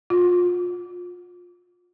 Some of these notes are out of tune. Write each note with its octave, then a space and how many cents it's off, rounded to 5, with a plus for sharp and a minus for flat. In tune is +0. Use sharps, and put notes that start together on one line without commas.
F4 +25